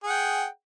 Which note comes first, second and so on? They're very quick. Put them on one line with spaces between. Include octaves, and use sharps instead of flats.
G#4 F#5 G5